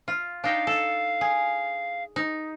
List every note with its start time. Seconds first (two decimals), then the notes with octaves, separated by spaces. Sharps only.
0.08 F4
0.44 D4 D#4 F5 G5
0.67 A4
1.21 G#4
2.16 D#4